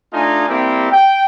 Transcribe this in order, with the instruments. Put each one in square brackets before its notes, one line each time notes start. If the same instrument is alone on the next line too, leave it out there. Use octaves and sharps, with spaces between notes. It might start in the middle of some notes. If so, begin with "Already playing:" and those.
[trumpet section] A3 D4 D#4 F4 D#5 G#5
G3 A#3 C4 E4 G4
G5